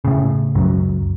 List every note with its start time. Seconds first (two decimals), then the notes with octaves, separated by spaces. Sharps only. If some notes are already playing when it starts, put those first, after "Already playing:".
0.05 A2 C#3
0.55 C#2 F#2 F#3